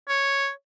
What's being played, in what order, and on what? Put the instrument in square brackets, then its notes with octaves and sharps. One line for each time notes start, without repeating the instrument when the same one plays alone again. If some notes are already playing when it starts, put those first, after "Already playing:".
[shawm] C#5